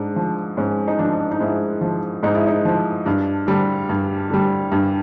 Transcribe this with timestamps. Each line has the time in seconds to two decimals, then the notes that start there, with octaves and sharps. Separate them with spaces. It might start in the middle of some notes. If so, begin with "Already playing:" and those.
Already playing: G#2 D4
0.16 F3
0.57 G#2 C#4
0.88 D#4
0.99 F3 D4
1.31 D#4
1.40 G#2 E4
1.81 F3
2.23 G#2 D#4
2.35 E4
2.47 D#4
2.65 F3
3.05 G2 D4
3.47 D3 G3
3.89 G2
4.30 D3 G3
4.72 G2